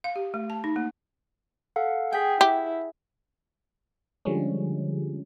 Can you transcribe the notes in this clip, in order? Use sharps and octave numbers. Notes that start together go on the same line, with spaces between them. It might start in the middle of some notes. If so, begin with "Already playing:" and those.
F5
G4
A3
A5
D#4
A#3
A4 F5 F#5
G#4 F#5 G5 G6 B6
E4 G4
D3 F3 G3 G#3 C#4